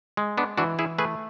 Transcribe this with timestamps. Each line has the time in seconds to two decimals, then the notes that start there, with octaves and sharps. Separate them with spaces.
0.17 G#3
0.38 B3 D4
0.57 E3 D4 F#4
0.79 E4 G#4
0.98 A3 G#4 B4